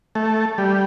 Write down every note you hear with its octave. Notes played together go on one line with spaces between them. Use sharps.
A3
G3